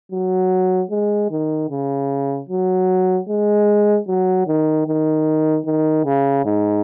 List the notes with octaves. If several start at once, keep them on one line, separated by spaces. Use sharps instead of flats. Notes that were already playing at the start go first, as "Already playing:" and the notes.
F#3
G#3
D#3
C#3
F#3
G#3
F#3
D#3
D#3
D#3
C#3
G#2